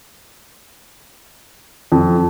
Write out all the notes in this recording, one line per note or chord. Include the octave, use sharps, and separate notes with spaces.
F2